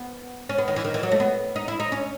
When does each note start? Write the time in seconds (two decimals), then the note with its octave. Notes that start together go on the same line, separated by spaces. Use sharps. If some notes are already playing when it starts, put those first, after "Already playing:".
Already playing: B3
0.49 C#4
0.58 B3
0.68 D#3
0.76 E3
0.85 D#3
0.94 E3
1.03 F#3
1.12 A3
1.20 B3
1.56 D#4
1.68 E4
1.80 D#4
1.92 C#4